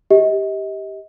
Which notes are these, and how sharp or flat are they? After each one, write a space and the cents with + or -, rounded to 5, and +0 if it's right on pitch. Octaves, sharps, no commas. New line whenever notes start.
G4 +0 D#5 +35